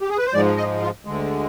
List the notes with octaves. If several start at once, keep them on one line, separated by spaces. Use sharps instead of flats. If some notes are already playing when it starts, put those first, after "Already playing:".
G4
G#4
B4
C5
G#2 F3 G#3 D5
D#5
F4
D2 D3 G#3